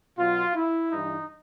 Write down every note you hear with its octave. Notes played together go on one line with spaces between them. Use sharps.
B2 F#3 F4
E4
G2 E3 D#4